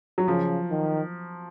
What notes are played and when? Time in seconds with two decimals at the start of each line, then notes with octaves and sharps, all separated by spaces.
0.18 F#3
0.28 C#3 F3
0.70 D#3